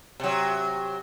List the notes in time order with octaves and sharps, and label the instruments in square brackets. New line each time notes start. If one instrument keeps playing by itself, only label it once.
[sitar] C3 F#3